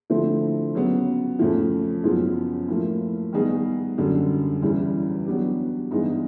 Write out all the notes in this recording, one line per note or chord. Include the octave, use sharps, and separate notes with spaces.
D3 F3 A3 C4 E4
C#3 F#3 B3
F2 C#3 F3 A3
F#2 C#3 F3 G#3 B3
A2 F3 A#3
D#3 G3 B3 D#4 G#4
F#2 D3 G3
E2 C#3 E3 G3
F#3 B3 D4 G4
G2 E3 G#3 B3 D#4